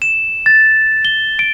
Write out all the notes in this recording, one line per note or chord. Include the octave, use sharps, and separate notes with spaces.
E7
A6
G7
D7